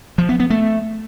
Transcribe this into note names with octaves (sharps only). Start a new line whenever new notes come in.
F3
B3
B3
A3